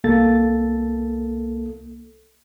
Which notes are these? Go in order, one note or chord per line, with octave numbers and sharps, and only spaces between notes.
C2 A#3 A4 A6